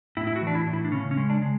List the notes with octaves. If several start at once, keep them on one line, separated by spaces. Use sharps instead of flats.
A2 E4
E4
F#4
E3 D4
E4
A2
E4
D4
C#3 C#4
C#4
G#3
D4
G#3